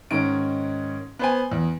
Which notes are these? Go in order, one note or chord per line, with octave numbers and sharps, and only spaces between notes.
G#2 D#3 C#4 D7
B3 C5 G#5
E2